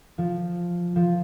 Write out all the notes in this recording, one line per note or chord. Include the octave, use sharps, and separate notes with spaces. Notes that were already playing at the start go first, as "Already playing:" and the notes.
F3
F3